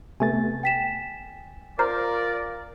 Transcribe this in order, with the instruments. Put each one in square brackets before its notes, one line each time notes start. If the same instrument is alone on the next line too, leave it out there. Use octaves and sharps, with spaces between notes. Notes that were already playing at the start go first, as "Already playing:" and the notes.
[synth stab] C3 A3 B3 [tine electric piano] G#5 A6
[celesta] G5 B6 E7
[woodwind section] F4 A#4 D5 [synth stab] C5 [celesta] A#5 F6